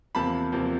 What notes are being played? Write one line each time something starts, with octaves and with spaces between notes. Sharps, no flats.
E2 C3 F3 A#3 A5 B5
E2 C3 F3 A#3